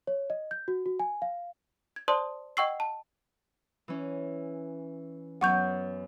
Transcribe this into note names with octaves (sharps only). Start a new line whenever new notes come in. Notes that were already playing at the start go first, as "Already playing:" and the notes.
C#5
D#5
G6
F#4
F#4
G#5
F5
G#6
C5 D5 A5 C6 D#6
D#5 F#5 G5 C#6 E6 C7
A5
E3 C#4
F#2 B3 F#5 C#6 G6